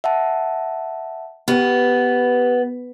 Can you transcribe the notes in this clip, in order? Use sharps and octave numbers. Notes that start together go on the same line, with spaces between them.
E5 F#5 A5
B3 G4 B4